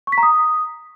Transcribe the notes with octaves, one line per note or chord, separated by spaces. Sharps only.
C#6
B6
A#5
D#6